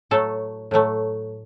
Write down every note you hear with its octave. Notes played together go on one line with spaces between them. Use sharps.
A2 F#3 A3 A4
A2 F#3 A3